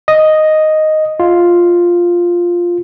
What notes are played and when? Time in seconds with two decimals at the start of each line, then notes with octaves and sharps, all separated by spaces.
0.08 D#5
1.20 F4